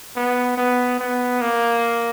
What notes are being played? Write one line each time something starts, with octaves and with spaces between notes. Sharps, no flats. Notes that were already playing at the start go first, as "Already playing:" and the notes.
B3
B3
B3
A#3